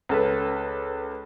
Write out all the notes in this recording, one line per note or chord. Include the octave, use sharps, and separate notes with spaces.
C#2 A4 B4